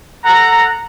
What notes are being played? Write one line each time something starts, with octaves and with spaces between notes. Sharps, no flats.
A4 F#5 A#5